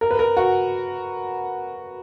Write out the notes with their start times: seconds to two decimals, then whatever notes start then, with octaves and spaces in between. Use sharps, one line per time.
0.01 A#4
0.11 B4
0.19 A#4
0.37 F#4